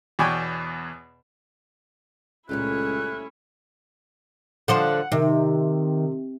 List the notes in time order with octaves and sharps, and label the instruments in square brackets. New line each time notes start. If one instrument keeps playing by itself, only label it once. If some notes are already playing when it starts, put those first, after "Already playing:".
[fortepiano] E2 B2 C#5 D5 G5 G#5
[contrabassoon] C#2 [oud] A#2 G3 A3 [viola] C#4 E4 [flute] F#6
[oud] D3 F3 C5 [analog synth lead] F#5
[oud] C3 [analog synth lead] D#3